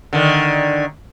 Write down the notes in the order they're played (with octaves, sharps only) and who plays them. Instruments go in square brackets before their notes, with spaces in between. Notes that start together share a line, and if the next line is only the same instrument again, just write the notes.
[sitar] D3 D#3